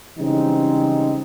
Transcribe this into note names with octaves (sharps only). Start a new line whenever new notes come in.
C#3 E3 G3 G#3 C4 D#4